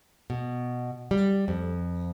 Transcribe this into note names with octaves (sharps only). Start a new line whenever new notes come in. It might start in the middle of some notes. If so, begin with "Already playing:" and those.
B2
G3
F2